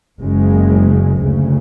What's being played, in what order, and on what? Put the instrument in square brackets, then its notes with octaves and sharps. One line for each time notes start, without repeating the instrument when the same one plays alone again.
[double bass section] F#1 F#2 C#3 G#3
D2 C#3